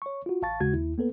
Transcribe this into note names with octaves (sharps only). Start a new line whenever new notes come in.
C#5 C#6
F4 F#4
A1 F5 A5 C#6 A6
D#2 C#3 G#3 F#4 G#6
D#2 E4
A#3 B3 A4 B4